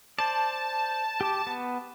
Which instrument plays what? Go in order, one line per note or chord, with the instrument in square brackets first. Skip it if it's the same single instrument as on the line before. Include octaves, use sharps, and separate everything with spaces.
[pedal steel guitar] C5 D5 [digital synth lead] A5
[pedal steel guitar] G4 D6
B3